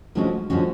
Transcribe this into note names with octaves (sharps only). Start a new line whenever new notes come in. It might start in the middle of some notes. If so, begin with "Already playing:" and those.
D3 F3 G#3 C#4 F#4
D3 F3 G#3 C#4 F#4